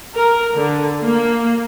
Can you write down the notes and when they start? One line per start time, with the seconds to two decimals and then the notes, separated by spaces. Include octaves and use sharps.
0.15 A#4
0.55 D3
1.02 A#3